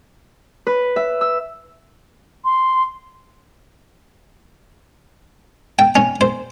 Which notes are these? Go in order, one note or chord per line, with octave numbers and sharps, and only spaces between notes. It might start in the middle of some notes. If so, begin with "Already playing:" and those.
B4
E5
E6
C6
G5
C#4
C5